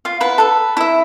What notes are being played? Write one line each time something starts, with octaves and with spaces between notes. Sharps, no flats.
F4 F5
E4 B4 F#5
A4 B4
E4 E5